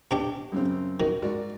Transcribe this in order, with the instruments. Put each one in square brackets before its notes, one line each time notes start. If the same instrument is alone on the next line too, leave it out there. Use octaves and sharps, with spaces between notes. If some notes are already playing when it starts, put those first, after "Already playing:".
[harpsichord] B2 D4 G4
[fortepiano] F#2 C#3 C4
[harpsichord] D#3 [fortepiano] F#4
[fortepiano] G#2 F#4 D5